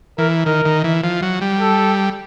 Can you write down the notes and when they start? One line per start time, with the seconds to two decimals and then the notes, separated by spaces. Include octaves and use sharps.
0.18 E3 A#4
0.46 D#3 A#4
0.65 D#3
0.84 E3
1.04 F3
1.22 F#3
1.41 G3
1.60 A4